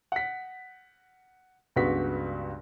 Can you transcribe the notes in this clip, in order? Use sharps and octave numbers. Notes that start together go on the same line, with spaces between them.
F#5 B6
C#2 G2 B3 F#4 B6